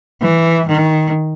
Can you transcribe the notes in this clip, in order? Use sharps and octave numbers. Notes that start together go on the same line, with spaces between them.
E3
D#3